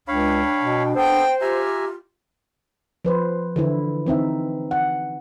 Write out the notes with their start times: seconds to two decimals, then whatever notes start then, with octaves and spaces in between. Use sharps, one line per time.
0.08 C#2 D4 C#5 F5 G5 B5
0.61 B2
0.95 B3 A4 C5 G5
1.41 F4 G4 E5 G#5 A#5
3.05 F3 B4 C5
3.56 D3 E3 E4
4.06 E3 C4 D#4 E5
4.71 F#5